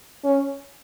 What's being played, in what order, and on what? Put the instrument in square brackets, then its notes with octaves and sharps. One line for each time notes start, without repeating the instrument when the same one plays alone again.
[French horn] C#4